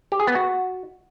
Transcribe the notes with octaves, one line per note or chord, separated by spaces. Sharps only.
G4
G#4
B3
F#4